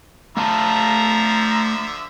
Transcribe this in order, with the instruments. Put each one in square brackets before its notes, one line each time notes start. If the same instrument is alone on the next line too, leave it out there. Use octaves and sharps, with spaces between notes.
[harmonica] D3 F3 E5 [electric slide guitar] A3 F5 A5 [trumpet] A#5